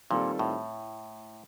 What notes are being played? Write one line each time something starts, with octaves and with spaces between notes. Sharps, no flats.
A#2 D#3 G3 C4 F4 A4
A2